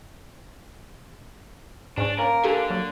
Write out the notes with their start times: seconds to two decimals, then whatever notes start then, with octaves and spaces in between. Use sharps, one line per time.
1.97 G#2 C#4 D4
2.19 A#3 C#4 A#4
2.44 D3 G4 A4 G#5
2.70 F#3 A#3